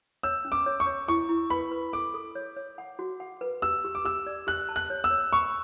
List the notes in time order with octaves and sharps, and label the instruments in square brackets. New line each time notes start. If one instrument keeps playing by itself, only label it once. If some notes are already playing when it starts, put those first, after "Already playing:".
[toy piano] C#5 [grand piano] E6
[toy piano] C#4
[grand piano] D6
[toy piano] C#5
[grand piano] C#6
[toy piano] C#5
[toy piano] E4 [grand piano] C#6
[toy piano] E4
[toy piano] B4 [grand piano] B5
[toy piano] B4
[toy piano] A4 [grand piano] D6
[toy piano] A4
C#5
C#5
F#5
F#4
F#5
B4
[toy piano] G4 [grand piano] E6
[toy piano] G4
[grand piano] D6
[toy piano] G4 [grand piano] E6
[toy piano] D5
[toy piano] G4 [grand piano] F#6
[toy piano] A5
[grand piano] F#6
[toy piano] C#5
[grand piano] E6
[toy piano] C#5
[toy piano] B5 [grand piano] C#6